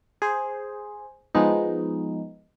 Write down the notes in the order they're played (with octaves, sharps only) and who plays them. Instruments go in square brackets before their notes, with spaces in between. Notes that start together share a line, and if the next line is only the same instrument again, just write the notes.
[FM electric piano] G#4 C5
F3 G#3 B3 D#4